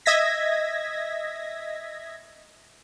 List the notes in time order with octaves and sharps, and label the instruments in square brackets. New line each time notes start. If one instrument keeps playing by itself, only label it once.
[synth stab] D#5 E5 G#6 A#6 B6